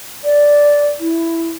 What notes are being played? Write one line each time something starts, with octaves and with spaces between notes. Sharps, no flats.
D5
E4